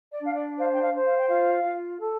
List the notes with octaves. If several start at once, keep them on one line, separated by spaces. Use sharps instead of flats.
D5
D4 F5
D5
C5 F5
G5
F5
C5
F5
G5
F4 F5
F4
A4